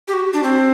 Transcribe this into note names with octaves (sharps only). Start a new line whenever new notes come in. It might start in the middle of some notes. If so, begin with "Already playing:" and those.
G4
F#4
D4
C4